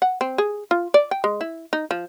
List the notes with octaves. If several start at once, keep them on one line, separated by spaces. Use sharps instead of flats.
F#5
C4
G#4
F4
D5
G5
G#3
E4
D#4
F3